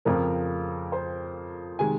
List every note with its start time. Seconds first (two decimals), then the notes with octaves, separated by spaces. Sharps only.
0.05 F2 C#3 F3 C4 A#4
0.92 C5
1.79 C3 D#3 G#3 G#5